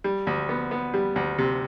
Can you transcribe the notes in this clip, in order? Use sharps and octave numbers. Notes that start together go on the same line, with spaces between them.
G3
D2
B3
B3
G3
D2
C3